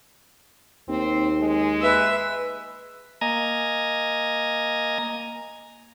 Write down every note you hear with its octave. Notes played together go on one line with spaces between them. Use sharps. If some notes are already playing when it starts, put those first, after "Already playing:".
D#2 C4
G#3
B4 E5
A#3 D#5 G#5 A#5